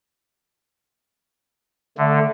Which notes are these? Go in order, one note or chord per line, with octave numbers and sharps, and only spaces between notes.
D3 A3